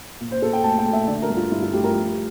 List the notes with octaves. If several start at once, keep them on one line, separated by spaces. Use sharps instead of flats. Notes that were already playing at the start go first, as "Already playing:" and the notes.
A#2
C5
A#2 A4
G5
A3 A5
G5
A3
E5
D3 D5
A#4
G2
F4
G2 E4
F4
A3 G4
A#4
F3